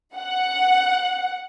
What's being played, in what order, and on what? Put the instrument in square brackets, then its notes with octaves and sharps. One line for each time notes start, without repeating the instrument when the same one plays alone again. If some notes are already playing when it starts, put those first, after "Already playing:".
[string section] F#5